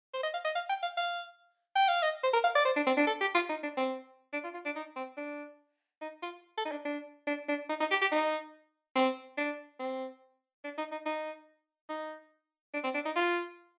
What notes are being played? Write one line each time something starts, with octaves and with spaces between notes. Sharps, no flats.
C5
D#5
F5
D#5
F5
G5
F5
F5
G5
F5
D#5
C5
A#4
F5
D5
C5
D4
C4
D4
A4
G4
F4
D#4
D4
C4
D4
F4
F4
D4
D#4
C4
D4
D#4
F4
A4
D#4
D4
D4
D4
D4
D#4
D#4
G4
G4
D#4
C4
D4
C4
D4
D#4
D#4
D#4
D#4
D4
C4
D4
D#4
F4